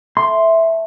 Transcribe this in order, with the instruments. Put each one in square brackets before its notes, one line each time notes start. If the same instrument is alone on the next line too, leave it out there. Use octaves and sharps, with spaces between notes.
[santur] A3 [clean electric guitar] C6